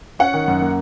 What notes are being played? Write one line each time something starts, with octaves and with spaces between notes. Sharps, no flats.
C#4 F#5
D#3
F#2
A#3